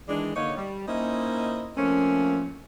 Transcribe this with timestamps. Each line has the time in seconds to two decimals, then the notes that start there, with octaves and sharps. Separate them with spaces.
0.09 D#3 E3 G#3 D4
0.36 D3 A#3 D#4 C#5
0.56 G3
0.88 A#3 C#4 D#4 E4 C5 D#5
1.77 F3 A3 A#3 C4 C#4